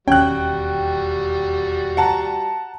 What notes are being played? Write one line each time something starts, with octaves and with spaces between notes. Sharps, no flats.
E1 D#2 G3 C#4 F#4 G5 F#6
F#5 A5 A#5